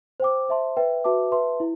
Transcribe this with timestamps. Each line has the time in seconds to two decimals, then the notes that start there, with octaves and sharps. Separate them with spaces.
0.20 C5 G5 D6
0.49 C5 E5 A5 C6
0.77 B4 E5 G5
1.04 F#4 B4 E5 A5 D6
1.32 B4 E5 A5 C6
1.60 E4